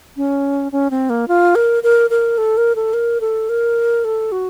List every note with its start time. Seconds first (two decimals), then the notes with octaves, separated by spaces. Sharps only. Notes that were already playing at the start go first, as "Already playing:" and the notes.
0.17 C#4
0.72 C#4
0.91 C4
1.10 A#3
1.28 F4
1.55 A#4
1.83 A#4
2.10 A#4
2.38 A4
2.57 A#4
2.76 A4
2.94 A#4
3.21 A4
3.49 A#4
4.05 A4
4.32 F#4